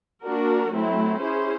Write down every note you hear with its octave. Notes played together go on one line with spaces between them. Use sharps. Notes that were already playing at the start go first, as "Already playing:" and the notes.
A#3 D4 F#4 A#4
F#3 A3 C4 E4
C#4 E4 G#4 C5